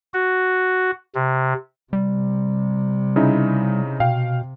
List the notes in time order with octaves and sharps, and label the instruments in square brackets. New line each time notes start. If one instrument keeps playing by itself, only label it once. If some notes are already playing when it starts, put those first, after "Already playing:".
[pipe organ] F#4
C3
[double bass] C3 [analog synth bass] G3
[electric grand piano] C#3 D#4 E4
[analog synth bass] B2 [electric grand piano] F5 G5